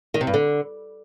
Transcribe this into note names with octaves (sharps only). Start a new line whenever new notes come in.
D#3
C3
G2
D3